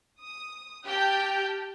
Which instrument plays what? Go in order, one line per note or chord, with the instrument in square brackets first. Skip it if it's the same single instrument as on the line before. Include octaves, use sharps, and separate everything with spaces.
[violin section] D#6
G4 G5 A5 F6 G6